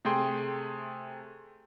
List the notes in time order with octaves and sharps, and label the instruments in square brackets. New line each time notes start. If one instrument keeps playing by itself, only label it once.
[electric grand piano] C3 A3 G#4 G5 C6